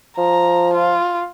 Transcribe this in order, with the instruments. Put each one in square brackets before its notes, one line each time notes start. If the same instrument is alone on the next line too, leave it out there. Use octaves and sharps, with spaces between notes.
[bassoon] F3 [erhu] A#5
[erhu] F4